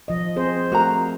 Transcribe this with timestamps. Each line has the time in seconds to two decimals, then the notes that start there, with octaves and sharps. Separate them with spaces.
0.08 F3 D#5
0.36 C4 G#4 C5
0.72 A3 F#4 A#4 A#5